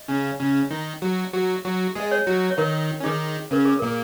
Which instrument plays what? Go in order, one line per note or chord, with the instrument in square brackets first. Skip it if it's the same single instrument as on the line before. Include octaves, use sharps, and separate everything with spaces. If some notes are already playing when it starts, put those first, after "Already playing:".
Already playing: [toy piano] D#5
[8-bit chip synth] C#3 C#4
C#3 C#4
D#3 D#4
F#3 F#4
F#3 F#4
F#3 F#4
[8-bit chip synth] G#3 G#4 [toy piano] D#5
[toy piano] C#5
[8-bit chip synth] F#3 F#4
[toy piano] C#5
[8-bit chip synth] D#3 D#4 [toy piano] A#4
[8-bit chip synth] C#4
[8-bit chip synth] D#3 D#4 [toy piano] G#4
[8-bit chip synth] C#3 C#4 [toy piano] A#4
[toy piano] G#4
[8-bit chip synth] A#2 A#3 [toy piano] A#4